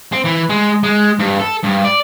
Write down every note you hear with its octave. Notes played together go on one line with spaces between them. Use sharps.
C4
E3
G#3
G#3
G2
A4
G2
D5